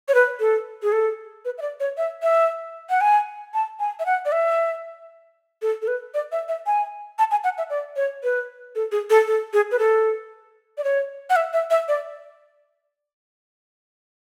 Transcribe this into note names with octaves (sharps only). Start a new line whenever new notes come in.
C#5
B4
A4
G#4
A4
B4
E5
D5
C#5
E5
E5
F#5
G#5
A5
G#5
E5
F#5
D5
E5
A4
A4
B4
D5
E5
E5
G#5
A5
G#5
F#5
E5
D5
C#5
B4
A4
G#4
A4
A4
G#4
B4
A4
D5
C#5
F#5
E5
E5
E5
D5